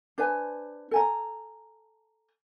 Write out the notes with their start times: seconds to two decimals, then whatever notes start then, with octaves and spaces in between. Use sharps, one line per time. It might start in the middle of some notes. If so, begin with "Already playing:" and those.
0.18 D4 B4 C5 G#5
0.91 A4 G#5 A#5